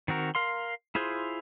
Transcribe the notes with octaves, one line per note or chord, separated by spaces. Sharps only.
D#3 C4 F#4 A#4
A#4 F5 C6
E4 F4 G#4 C5